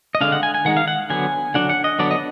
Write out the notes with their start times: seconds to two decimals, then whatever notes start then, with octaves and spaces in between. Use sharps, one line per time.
0.15 D#5
0.21 D3 G#3 D4 F5
0.32 F#5
0.43 G#5
0.54 G#5
0.65 D#3 G#3 D#4 F#5
0.77 F5
0.88 F#5
1.10 D3 F#3 B3 G#5
1.54 D3 F#3 D4 F#5
1.69 F#5
1.84 D#5
1.99 D3 F#3 B3 D4 D5
2.11 D#5